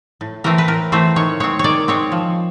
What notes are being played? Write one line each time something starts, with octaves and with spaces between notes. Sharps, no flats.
A2
E3 A3 C4 A#4
B4
A2 A#4
E3 A3 C4 C5
D#3 C#5
G#3 C4 C#5
D#3 C#5 D5
G#3 C4 C#5
F3